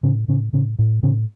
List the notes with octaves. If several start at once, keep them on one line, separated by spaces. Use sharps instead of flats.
A2 C#3 C#4
A2 C#3 C#4
A2 C#3 C#4
A2
A2 C#3 C#4